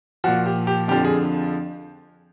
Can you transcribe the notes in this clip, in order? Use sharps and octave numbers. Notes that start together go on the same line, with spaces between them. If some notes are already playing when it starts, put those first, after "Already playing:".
A#2 F3 F#4
G4
G4
F2 D3 F3 G4
G#4